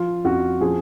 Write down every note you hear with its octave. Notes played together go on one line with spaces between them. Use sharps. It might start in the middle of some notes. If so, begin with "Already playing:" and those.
Already playing: F3 F4
F2 F#4
F3 G#4